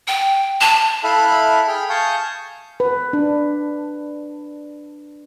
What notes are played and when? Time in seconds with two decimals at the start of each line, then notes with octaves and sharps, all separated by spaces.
0.07 G5
0.61 A5
1.04 E4 A4 E5 F5 B5 F#6
1.68 G#4 G5 B5 F6
1.90 F5 G#5 A5 C#6 D#6 G6
2.80 B4
3.13 D4